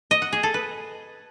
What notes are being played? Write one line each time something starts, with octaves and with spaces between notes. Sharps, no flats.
D#5
F#5
G#4
A4
B4